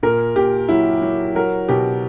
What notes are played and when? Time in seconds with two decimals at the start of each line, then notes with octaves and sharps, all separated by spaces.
0.03 A#2 A#4
0.36 A#2 G4
0.69 F#3 E4
1.02 F#3
1.35 F#3 A#4
1.69 B2 G4